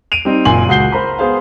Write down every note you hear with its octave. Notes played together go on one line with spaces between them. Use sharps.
D7 D#7 F7
G3 C4 D#4
F#1 A#2 G#5 C6 F#7
C#2 F#4 G6 C7 G7
A#4 C5 A#5 B5
B3 G#4 C5 F5